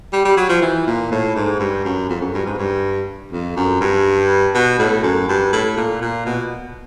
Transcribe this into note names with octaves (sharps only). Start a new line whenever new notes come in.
G3
G3
F#3
F3
E3
A#2
A2
G#2
G2
F#2
F2
F#2
G2
G#2
G2
F2
F#2
G2
B2
A2
F#2
G2
A2
A#2
A#2
B2